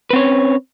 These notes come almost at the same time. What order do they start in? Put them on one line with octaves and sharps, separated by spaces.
B4 C4 C#5 C#4